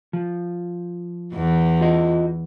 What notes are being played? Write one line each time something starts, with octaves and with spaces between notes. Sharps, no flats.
F3
E2 E3
F4 D#5